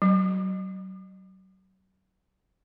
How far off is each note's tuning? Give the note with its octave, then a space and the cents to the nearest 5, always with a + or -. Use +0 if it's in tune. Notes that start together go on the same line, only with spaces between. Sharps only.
F#3 +35